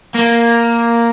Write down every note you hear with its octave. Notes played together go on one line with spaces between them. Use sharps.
A#3